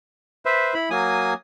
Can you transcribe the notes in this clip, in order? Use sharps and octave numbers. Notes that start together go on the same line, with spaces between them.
B4 C5 E5
E4 B5
F#3 A#3 G#5 D#6